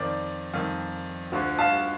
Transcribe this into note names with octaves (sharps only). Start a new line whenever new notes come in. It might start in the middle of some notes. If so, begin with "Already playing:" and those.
Already playing: F2 D#3 D5
F2 D#3
D2 D3 F3
F5 A5